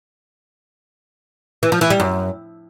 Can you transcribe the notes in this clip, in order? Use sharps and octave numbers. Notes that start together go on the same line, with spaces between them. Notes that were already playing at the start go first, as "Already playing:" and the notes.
E3
F3
E3
G3
F#2